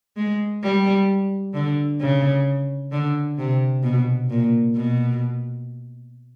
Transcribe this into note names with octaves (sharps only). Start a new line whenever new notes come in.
G#3
G3
D3
C#3
D3
C3
B2
A#2
B2